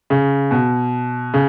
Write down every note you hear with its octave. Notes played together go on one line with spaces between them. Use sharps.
C#3
B2
C#3